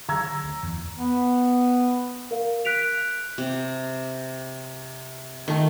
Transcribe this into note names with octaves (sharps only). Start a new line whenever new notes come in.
D3 F#3 A#5 E6 G#6
D2
E2
B3
A#4 F5
F#6 B6 D7 F7
C3
D#3 A3